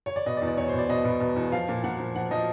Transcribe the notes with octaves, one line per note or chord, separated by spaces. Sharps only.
C#5
D5
B2 D#5
D5
E2
D5
E2 C#5
C5
B2 D5
B2 D#5
B2
B2
E2
F3 F5
A#2
A#2 F#5
F3
F3 F#5
F3 D#5